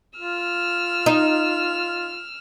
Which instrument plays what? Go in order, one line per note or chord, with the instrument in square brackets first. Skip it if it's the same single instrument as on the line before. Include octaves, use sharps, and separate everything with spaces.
[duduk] F4 [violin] E6 F6
[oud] D#4